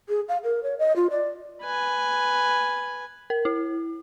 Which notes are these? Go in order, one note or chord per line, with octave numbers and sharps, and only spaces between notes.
G#4
F5
A#4
C#5
D#5
F4
D5
B4 G#5
A#4
E4